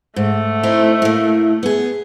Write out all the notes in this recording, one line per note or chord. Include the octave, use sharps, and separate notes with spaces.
G#2 A3
C4 D#4 E4
A2 A#3
B3 G#4